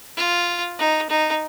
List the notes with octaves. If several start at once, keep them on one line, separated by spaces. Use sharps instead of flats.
F4
D#4
D#4